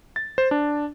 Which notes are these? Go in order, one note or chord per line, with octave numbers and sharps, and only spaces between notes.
A6
C5
D4